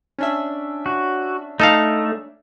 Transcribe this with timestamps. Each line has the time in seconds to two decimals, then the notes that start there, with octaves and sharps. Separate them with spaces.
0.19 C#4 D4 E5
0.86 F#4
1.60 A3 D#4 A4 F5